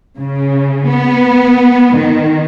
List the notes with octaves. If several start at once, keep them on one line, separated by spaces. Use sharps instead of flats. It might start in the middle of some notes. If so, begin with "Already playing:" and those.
C#3
B3
D#3